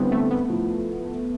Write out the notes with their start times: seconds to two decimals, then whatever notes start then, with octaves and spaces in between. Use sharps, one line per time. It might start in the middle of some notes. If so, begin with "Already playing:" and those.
Already playing: D3 G3 B3 C4 E4
0.12 A3
0.31 B3
0.49 F3 A3 E4